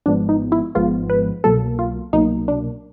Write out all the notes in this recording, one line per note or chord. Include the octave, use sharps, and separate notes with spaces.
G#1 G#2 F3 G#3 B3 D4
D#4
E4
G#1 G#2 F3 G#3 B3 F4
B4
C2 B2 F#3 A#3 A4
F4
C2 B2 F#3 A#3 D#4
D4